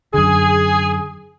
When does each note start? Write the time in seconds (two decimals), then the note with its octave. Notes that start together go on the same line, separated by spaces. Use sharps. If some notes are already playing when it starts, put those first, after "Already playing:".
0.14 F#2 D3 G#4